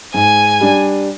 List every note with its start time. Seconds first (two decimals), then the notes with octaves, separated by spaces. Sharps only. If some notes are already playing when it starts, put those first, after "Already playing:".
0.14 G#2 G#5
0.60 G3 D4